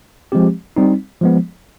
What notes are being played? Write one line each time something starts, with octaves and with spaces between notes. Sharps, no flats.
F3 G#3 C4 G4
G3 C4 D#4
F3 G#3 B3